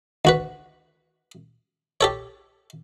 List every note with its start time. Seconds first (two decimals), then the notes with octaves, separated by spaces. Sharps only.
0.25 D2 F#4 B4
2.01 G4 A4 C#5